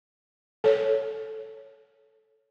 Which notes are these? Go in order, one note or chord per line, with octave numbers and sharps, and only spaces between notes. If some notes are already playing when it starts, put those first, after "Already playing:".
A4 C#5